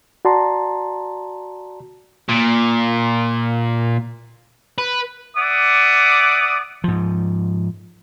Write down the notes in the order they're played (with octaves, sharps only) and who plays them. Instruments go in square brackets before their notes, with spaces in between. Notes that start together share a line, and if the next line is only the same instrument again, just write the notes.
[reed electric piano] F#4 D5 A5 A#5 C6
[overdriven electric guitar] A#2
B4
[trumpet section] D5 E5 F#5 D6 D#6
[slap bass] G#2 F3